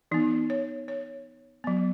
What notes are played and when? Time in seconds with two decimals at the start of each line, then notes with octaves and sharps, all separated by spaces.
0.11 E3 B3 D#4
0.50 C#5
0.88 C#5
1.64 F#3 B3